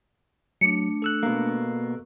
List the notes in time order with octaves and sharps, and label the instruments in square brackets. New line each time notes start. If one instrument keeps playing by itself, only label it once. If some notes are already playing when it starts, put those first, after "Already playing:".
[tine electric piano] F#3 [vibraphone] A3 D4 [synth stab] C#7
[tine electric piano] A4 E6 F#6
[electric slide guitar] B2 A#3